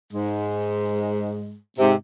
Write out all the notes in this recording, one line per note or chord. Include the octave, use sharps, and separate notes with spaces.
G#2 G#3
G#2 C3